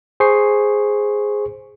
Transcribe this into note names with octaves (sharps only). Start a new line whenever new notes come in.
G#4 C5 C#6 C7